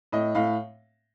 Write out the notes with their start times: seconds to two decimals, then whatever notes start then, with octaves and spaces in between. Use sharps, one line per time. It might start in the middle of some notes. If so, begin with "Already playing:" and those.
0.12 A2 D#5
0.35 A2 F5